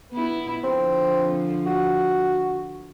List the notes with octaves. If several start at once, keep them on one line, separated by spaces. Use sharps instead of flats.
B3 E4
D3 F3 C4
F#4